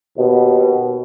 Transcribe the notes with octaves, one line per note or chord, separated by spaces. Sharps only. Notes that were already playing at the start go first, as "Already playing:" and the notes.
D#2 B2